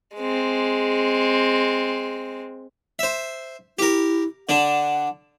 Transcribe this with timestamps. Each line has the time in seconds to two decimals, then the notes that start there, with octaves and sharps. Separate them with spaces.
0.16 G#3 C4
2.99 C5 E5
3.79 E4 G4 A#4
4.49 D3 D4 F#5